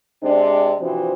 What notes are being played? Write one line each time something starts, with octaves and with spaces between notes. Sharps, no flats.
C3 G#3 C4 D4
C3 E3 F3 C4 D4 F#4